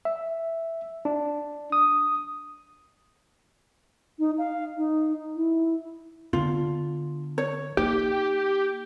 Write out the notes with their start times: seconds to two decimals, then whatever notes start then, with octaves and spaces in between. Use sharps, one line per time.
0.05 E5
1.05 D4
1.72 D#6
4.19 D#4
4.38 F5
4.77 D#4
5.35 E4
6.33 D3 B3 F4
7.38 C#5
7.77 A#3 D#4 G4